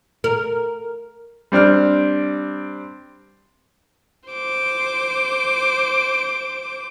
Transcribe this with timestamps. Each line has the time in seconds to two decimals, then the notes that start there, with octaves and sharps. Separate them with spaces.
0.24 A#4
1.52 G3 C4 D4 F6
4.29 C5 D6